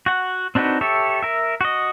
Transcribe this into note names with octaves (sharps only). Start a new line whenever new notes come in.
F#4 F#5
C4 D4 D#4 F#4 B4
G4 A4 C#5 E5
A#4 E5
F#4 D#5